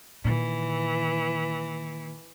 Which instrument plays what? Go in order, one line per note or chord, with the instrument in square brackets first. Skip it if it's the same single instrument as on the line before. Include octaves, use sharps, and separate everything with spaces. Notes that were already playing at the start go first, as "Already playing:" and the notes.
[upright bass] A#2 D#3 [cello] E3